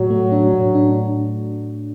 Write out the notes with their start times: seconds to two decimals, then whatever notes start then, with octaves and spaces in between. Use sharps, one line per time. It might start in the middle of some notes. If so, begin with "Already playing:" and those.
Already playing: A2 F#3
0.10 A3
0.32 D4
0.54 A2
0.75 D4